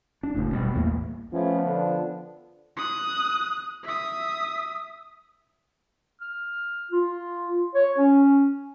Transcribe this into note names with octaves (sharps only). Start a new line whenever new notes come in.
D4
F#1 A2
B2 G3
A#1 E2 A2 A#3
F3 A3 B3 C#4
D3 B3 D4
D#6 F#6
E5 D#6
F6
F4
C#5
C#4